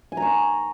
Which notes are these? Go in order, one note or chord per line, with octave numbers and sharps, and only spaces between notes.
G#5
A#5
C#6